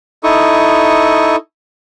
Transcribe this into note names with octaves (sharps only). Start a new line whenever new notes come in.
D#4 E4 A4 C#6 D#6